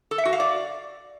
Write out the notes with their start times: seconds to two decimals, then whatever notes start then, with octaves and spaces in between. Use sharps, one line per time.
0.11 A4
0.18 E5
0.25 F#4
0.33 F5
0.40 D5